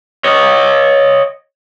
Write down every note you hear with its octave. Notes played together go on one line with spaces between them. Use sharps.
C#5 D#5